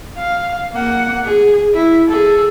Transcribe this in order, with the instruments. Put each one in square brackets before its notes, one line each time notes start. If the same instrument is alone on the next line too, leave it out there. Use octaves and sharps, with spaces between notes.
[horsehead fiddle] F5
A#3 F#5
G#4
E4
G#4 A4